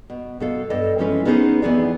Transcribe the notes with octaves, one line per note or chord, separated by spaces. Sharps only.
B2
B2 A4 F5
G2 A4 D#5
E3 F3 G#3 C#4 B4
B3 C#4 D#4 G#4 B4 C5
F2 E3 B3 G#4 D5